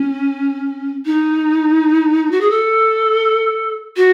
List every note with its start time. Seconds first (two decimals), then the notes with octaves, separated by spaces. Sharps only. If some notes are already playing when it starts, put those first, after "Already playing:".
Already playing: C#4
1.05 D#4
2.31 F#4
2.41 G#4
2.50 A4
3.96 F#4